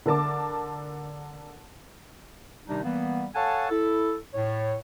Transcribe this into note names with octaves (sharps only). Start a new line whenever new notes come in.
D3 A#4 A5 D6
C3 D#3 G3 D4 D#4
E3 G3 A#3 B3
A4 C#5 F5 F#5 G#5 A5
E4 A4
A2 C#5